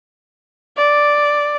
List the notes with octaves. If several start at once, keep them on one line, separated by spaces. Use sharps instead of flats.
D5